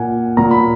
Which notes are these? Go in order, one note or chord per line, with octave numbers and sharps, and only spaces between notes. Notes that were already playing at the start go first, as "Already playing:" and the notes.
Already playing: A#2 A#3 F#5 G#5
A#2 A#3 A#5
B5